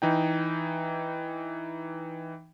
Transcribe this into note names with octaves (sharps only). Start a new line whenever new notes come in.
E3 D#4 G5